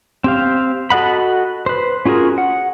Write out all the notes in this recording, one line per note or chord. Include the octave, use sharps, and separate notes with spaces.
C4 G4 F5
F#4 A4 D#5 F#5 B5
B4 C5
C#4 F4 F#4 G#4 A#4
F#5